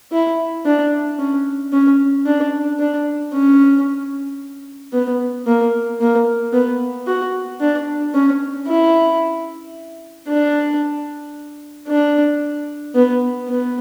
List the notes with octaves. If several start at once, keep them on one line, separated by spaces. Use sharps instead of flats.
E4
D4
C#4
C#4
D4
D4
C#4
B3
A#3
A#3
B3
F#4
D4
C#4
E4
D4
D4
B3
B3